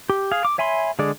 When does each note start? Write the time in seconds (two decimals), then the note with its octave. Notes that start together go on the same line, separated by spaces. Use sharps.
0.10 G4
0.31 G#4 F5
0.45 D6
0.58 C#5 E5 G#5 B5 C6
0.99 D3 G#3 G#4 D5